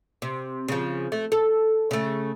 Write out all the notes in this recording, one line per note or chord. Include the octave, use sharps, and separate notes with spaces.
C3
C#3 F3
A3
A4
C#3 A3